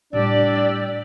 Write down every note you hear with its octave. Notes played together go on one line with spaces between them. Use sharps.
A2 G3 D4 G4 D5 E6